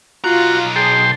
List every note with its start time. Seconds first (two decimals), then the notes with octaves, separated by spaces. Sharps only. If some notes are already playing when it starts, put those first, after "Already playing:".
0.24 B1 F4 F#4 A#5
0.76 G#4 G5 A5 C6